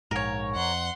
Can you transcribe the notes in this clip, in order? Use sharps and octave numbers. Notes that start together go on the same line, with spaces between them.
A#1 G#2 A#4 C#5
F2 F#5 C6